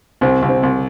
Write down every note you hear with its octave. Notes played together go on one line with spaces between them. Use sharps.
C2 C4
C2
C4
C2